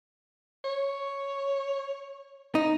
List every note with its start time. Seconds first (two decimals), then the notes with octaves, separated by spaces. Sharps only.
0.65 C#5
2.55 D#4